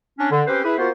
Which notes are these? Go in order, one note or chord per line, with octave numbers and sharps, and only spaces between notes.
C#4 D4
D3
C4 C#4 G4 B4 C5
E4 G#4 B4
A#3 B3 F4 F#4 C5